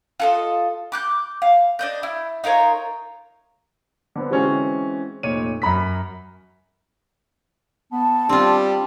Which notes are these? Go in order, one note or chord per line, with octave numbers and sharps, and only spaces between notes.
F4 A4 D#5
D6 F#6 G6
F5
D4 D#5 G6
E4
D#4 F4 A#4 C#5
D3 B3 C4
E3 G#3 C4 C#4 F#4
F1 A#2 C#5 D#7
F#2 A#5 B5 B6
B3 A5
G3 C4 D4 F4